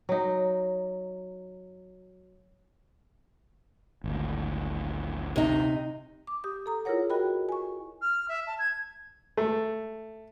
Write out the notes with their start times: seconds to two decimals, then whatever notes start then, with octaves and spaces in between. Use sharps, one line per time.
0.09 F#3 D#4
4.04 G#1 D2
5.36 C3 D#4
6.27 D6
6.44 G4 D#6
6.66 A4 A#5 D#6
6.85 E4 F4 G#4 A#4 C#5 F#5
7.10 F#4 A#4 D#5 G5 B5
7.49 G#5 C#6
8.02 F6
8.29 E5
8.47 A5
8.59 G#6
9.37 A3